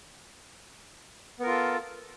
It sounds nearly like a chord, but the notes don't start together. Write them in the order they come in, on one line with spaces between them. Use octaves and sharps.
B3 A#4 F4 A4